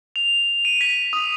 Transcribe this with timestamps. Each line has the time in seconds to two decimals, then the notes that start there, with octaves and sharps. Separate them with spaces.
0.16 F7
0.65 D#7
0.81 B6
1.13 D#6